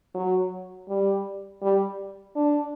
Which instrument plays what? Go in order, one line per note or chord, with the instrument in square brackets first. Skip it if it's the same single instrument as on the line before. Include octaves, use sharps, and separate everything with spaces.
[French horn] F#3
G3
G3
D4